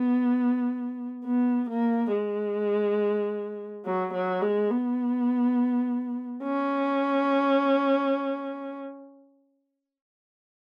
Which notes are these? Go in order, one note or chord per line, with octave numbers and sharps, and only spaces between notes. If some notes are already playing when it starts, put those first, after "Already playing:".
Already playing: B3
B3
A#3
G#3
F#3
F#3
G#3
B3
C#4